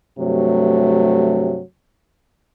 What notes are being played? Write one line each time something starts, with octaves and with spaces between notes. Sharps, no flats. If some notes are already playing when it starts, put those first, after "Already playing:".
G2 C3 F#3 A3